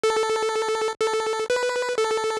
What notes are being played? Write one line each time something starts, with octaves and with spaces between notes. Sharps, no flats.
A4
A4
B4
A4